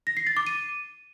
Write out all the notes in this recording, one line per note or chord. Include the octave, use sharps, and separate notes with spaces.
A#6
C7
A6
D6
D#7